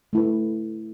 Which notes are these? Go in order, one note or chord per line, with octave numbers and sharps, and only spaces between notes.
A3 E4 B4